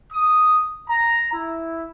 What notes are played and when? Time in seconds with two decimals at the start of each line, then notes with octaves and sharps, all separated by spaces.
0.11 D#6
0.89 A#5
1.33 E4